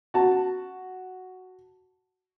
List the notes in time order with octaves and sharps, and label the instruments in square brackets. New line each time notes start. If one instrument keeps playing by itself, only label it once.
[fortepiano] F#4 A5